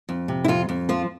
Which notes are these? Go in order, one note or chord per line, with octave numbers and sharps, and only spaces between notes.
F2
C3
E4
F2 F4
F2
F3 F4